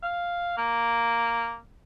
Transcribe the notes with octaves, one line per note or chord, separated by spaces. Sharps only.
F5
A#3